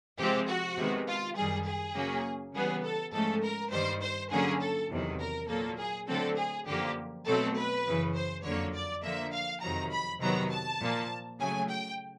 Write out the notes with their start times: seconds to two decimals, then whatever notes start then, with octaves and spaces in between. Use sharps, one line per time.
0.19 C3 F3 G#3 C4 G4
0.48 F#4
0.77 C3 D#3 G#3 B3
1.08 F4
1.36 F#2 D#3 G3 G#4
1.66 G#4
1.95 C#3 F#3 A#3 C#4
2.54 C#3 E3 G3 B3 G#4
2.84 A4
3.13 G#2 F3 A3 C#4 A4
3.43 A#4
3.72 G2 D#3 G3 C5
4.02 C5
4.31 D3 F#3 A#3 C#4 G#4
4.61 A4
4.90 E2 C3 D#3 F#3
5.20 A#4
5.49 A#2 F#3 A#3 A4
5.79 G#4
6.08 D3 F#3 A3 C4 A4
6.38 G#4
6.67 F#2 D3 F3 A#3 G4
7.26 B2 F#3 A3 C4 A4
7.56 B4
7.86 F#2 C#3 E3
8.15 C5
8.44 F2 D3 F#3 A#3 C#5
8.74 D5
9.03 D3 F3 A#3 E5
9.33 F5
9.62 F2 C3 D#3 F#3 A#5
9.92 B5
10.21 C3 D#3 F#3 B3 A#5
10.51 A5
10.80 A#2 F3 A#3
11.39 C#3 F#3 A3 G#5
11.69 G5